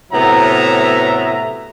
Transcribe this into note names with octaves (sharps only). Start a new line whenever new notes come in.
A2 C3 F#3 B3 E5 A#5